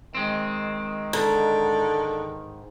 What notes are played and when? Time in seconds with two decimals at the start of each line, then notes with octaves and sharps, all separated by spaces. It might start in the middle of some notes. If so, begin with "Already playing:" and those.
0.15 D#3 G#3 C4
1.13 G#2 D3